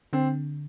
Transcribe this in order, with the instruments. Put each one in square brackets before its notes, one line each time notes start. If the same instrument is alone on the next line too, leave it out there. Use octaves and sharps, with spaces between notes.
[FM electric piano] D3 [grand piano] C4